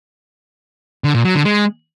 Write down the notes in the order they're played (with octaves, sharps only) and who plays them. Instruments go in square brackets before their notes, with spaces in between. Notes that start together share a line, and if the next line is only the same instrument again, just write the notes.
[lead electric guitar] D3
A#2
F#3
D3
G#3